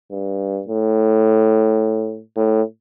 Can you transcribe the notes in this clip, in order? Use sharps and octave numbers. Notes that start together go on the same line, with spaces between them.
G2
A2
A2